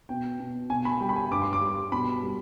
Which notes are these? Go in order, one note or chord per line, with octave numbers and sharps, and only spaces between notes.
B2 G5
B2
B2 G#5
B5
G3 G5
B5
G#5
G2 D6
C6
D6
G3
B2 B5
G3